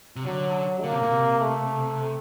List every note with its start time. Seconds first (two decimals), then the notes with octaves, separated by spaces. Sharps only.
0.16 C3
0.25 D3 F#3
0.83 D3 A#3
0.92 C3
1.02 A#2
1.11 C3
1.41 A3